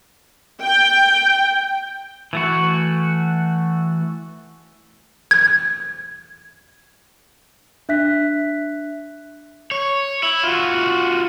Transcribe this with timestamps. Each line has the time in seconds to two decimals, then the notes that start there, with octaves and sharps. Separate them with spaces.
0.62 G5
2.33 E3 A3 F#4
5.31 G#6
7.89 D4 E5 F#6 B6
9.71 C#5
10.23 E4
10.43 F4 F#4